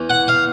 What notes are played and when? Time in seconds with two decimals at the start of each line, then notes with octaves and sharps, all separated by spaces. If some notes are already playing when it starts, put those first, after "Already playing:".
Already playing: E2 E3
0.10 F#5
0.28 F5